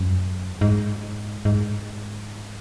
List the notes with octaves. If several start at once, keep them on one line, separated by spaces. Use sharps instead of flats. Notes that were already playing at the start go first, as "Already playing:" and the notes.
Already playing: F#2
G#2
G#2